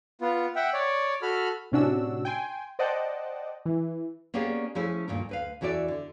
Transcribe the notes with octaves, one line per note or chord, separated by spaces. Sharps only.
B3 F4
E5 F#5 G5
C#5 D5
F#4 A4 B5 F6
A2 C3 C#4 D4 F#4 E6
G5 G#5 C6
C5 D5 D#5 F#5 G5 A5
E3
A#3 B3 C#4 G4 G#4 D5
F3 A3 C#4 E4 G#4 E5
D2 G2 A#2 D#3 A#4
D2 B4 F5
E2 E3 F#4 A4 D5 E5
D3